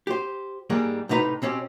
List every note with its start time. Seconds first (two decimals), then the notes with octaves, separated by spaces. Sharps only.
0.07 G4 C5
0.70 G#2 G3 G#3 A#3
1.09 A2 C3 D#4 B4 A#5
1.42 B2 C4 C#4 G4